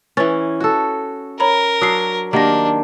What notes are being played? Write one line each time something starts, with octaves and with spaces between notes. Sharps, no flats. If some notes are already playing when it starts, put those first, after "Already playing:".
E3 C#4 B4 A6
F#4 A4
A#4 C#5 A#5 B5
F#3 D4 D#6 E6 C7
D#3 A#3 D4 G4 F#5 A#6